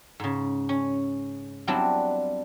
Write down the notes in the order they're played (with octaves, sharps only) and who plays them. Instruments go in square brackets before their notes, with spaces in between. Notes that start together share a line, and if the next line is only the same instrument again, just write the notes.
[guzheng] G#2 C#3
C#4
F#3 G3 B3 C4 D4 E4